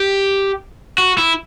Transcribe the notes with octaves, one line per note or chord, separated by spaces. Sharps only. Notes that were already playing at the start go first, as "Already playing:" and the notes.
Already playing: G4
F#4
E4